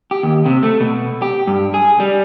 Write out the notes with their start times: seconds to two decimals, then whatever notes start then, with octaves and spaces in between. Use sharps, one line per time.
0.11 G4
0.23 D#2
0.46 C3
0.63 A3
0.81 B2
1.22 G4
1.47 G2
1.74 G#4
2.00 G3